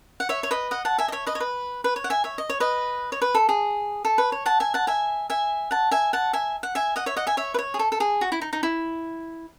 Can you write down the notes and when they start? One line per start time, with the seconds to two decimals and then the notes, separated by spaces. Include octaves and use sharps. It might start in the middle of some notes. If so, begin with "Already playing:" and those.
0.20 F#5
0.29 C#5 E5
0.43 C#5
0.51 B4 D#5
0.71 D#5 F#5
0.85 F#5 A5
0.98 E5 G#5
1.08 D#5
1.12 C#5 E5
1.26 B4 D#5
1.35 C#5
1.40 B4
1.84 B4
1.96 C#5
2.04 F#5
2.10 E5 G#5
2.24 C#5 E5
2.38 D#5
2.50 C#5
2.60 B4 D#5
3.12 C#5
3.22 B4
3.35 A4
3.49 G#4
4.05 A4
4.18 B4
4.32 C#5
4.46 F#5 A5
4.60 E5 G#5
4.74 F#5 A5
4.87 E5 G#5
5.30 E5 G#5
5.71 F#5 A5
5.91 E5 G#5
6.13 F#5 A5
6.33 E5 G#5
6.63 F#5
6.75 E5 G#5
6.96 D#5 F#5
7.06 C#5 E5
7.17 D#5 F#5
7.27 E5 G#5
7.37 C#5 E5
7.54 B4
7.59 C#5
7.74 G#4
7.79 A4
7.92 A4
8.00 G#4
8.21 F#4
8.32 E4
8.41 D#4
8.53 D#4
8.63 E4